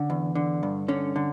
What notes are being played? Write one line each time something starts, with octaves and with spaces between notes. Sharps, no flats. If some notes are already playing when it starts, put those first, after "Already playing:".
Already playing: D3 C#4
E2
D3
G2
D3 C#4
D3